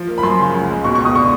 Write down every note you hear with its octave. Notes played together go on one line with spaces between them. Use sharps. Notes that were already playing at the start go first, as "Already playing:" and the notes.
Already playing: F3
A#3
B5
F#2 C6
C#3
C#2
G#3
B2 C#6
C#6
C#2 D#6
D3 C#6